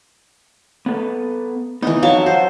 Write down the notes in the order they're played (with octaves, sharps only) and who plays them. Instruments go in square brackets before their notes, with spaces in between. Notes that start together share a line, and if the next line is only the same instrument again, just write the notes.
[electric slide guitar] B3 A4 B4
[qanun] E3 D#4 [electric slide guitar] B3
[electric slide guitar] F2 F5 [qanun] F#3 E5 A5
[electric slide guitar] F4 F#4 [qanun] C5